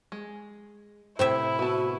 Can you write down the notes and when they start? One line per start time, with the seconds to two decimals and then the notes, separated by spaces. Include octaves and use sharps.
0.12 G#3
1.19 A2 C3 E4 C5 E5
1.59 B3 F#4 A5